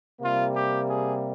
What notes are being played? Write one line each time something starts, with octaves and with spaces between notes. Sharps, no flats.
C3 G3 A#3 F4
G4
G#4